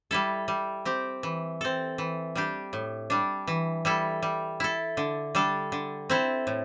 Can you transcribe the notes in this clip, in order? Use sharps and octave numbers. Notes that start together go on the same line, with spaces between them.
G3 E4 A4
G3
C4 G4
E3
C4 A4
E3
G3 D4 G4
A2
G3 D4
E3
G3 E4 A4
G3
E4 A4
D3
G3 D4 A4
D3
C4 E4 A4
A2